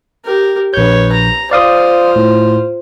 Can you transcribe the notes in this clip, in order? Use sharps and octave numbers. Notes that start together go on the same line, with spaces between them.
G4 A#4
A#1 B4 C#5 G6
A#5
F4 C5 D5 F5 D#6
A2